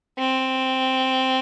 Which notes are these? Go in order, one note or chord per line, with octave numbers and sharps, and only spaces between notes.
C4